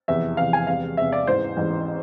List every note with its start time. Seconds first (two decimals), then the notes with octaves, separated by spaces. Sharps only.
0.08 F1 E2 C3 E3 E5
0.37 F1 E2 C3 E3 F5
0.53 G#5
0.67 E1 E2 C3 F5
0.97 E1 E2 C3 E5
1.12 D5
1.27 A1 G#2 E3 C5
1.57 A1 G#2 E3